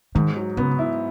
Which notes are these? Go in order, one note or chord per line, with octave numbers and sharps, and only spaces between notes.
G#2 D#3
F#3
C#3 B3
E4